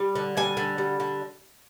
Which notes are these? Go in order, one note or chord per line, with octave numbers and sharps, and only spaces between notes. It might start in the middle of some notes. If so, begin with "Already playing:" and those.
Already playing: G3
D3
G3 G#5
D3
G3
D3